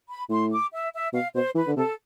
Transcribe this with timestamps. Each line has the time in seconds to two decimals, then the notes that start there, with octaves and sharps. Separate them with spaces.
0.09 B5
0.30 A2 C6
0.51 D6
0.72 E5
0.93 E5
1.13 B2 F5
1.34 B2 C5
1.55 E3 B4
1.68 D3
1.77 C3 A4